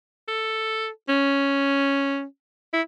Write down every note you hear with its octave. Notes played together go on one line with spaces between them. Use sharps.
A4
C#4
E4